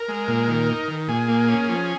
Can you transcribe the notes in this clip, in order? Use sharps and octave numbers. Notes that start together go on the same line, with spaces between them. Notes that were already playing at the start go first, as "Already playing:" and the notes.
Already playing: A#4
G#3
A#2
D#3
D#4
D#3
A#2 G#4
A#3
C#4
F3